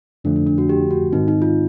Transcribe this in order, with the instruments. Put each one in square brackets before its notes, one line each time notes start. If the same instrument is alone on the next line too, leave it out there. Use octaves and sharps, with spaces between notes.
[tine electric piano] F2 D3 F3 A3 [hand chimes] D4
[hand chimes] D4
D4
F#4
G4
F#4
[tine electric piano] G#2 D#3 G#3 C4 [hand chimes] D#4
[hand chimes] D#4
F4